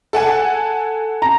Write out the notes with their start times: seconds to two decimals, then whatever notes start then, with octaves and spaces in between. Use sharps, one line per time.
0.13 A4 F#5 G#5
1.22 A#5